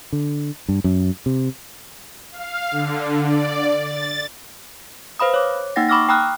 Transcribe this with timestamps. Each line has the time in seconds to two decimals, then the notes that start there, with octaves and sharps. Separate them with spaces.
0.13 D3
0.68 G2
0.84 F#2
1.26 C3
2.32 F5
2.71 D3
3.23 D5
3.81 A6
5.19 B4 C5 F5 B5 D#6
5.34 C#5 D6
5.76 A#3 D#4 F#5 G5 A6 A#6
5.89 B5 C#6 D6 E6 F6 A#6
6.09 G5 A#5 B5 D#6 F6 F#6